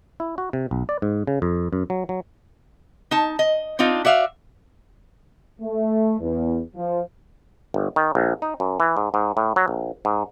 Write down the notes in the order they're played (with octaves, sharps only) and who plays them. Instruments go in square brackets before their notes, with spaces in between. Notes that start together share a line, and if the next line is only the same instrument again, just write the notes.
[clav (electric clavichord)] E4
F#4
C3
B1
D5
G#2
C#3
F2
F#2
F#3
F#3
[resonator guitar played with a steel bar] D#4 A5
D#5
C4 D4 D#4 F4
F#4 D5 E5 F5
[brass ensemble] A3
E2
F3
[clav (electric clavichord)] G1
D#3
A#1
D#4
F#2
E3
G#2
G#2
A2
F#3
A#1
G#2